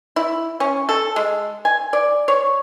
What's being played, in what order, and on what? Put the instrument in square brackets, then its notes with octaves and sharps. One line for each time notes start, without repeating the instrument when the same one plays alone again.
[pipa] E4
C#4
A4
G#3
G#5
D5
C#5